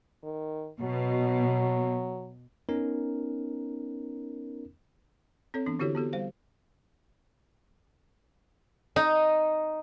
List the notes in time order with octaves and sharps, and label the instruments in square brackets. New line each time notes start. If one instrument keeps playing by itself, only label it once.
[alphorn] D#3
[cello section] B2 [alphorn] F#3
[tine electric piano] B3 C#4 D#4 A#4
[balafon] C4 A4 C#5
E3 B3 D4
D3 E4 F#4 G4 A4 C#5
B3 F#4 G4 A4
G3 C5 F5
[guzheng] D#4